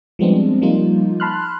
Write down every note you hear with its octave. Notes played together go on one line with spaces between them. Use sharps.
F3 G3 G#3 B3 C4 D4
F3 G3 A#3 D#4 F4
A5 B5 C6 F6 F#6